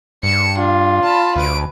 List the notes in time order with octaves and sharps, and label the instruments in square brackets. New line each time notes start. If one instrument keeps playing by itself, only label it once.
[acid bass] G2 [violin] C#7 E7
[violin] D4 [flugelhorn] F4
[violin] A5 B5
[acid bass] D2 [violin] B4 D7